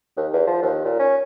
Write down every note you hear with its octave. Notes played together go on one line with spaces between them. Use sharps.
D#2
E2
F3
D#2
A#2
C#4